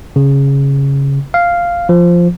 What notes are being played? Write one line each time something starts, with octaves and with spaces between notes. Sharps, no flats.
C#3
F5
F3